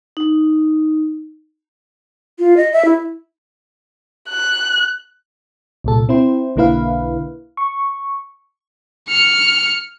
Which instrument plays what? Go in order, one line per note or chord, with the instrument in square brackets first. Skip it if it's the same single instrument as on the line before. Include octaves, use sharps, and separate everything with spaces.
[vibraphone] D#4
[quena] F4
D#5
E5
E4
[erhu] F#6
[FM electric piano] C2 A#2 A4
C4 E4 C5
B1 D3 A#3 E4 B4 F5
C#6
[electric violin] F6 C#7